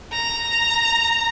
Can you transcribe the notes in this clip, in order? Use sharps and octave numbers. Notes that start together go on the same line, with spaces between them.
A#5